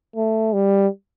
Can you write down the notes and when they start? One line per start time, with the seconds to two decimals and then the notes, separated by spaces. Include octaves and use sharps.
0.16 A3
0.53 G3